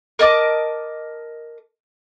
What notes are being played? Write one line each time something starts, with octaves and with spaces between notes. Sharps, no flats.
A#4 D#5 A5 D6